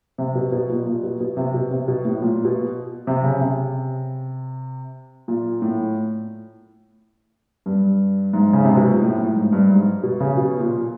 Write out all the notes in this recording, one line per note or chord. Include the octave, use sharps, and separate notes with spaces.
C3
B2
B2
A#2
A#2
B2
B2
C3
B2
C3
B2
A2
A#2
B2
C3
C#3
C3
A#2
A2
G2
G#2
C#3
C3
B2
A#2
A2
A2
G#2
G2
G#2
B2
C#3
B2
A#2